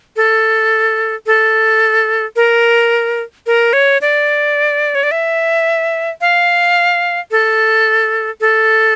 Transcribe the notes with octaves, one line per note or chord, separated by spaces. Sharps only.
A4
A4
A#4
A#4
C#5
D5
C#5
D5
E5
F5
A4
A4